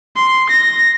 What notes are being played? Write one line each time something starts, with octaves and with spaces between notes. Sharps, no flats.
C6
A#6